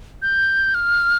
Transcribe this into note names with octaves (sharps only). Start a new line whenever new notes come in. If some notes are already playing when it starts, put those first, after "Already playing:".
G6
F6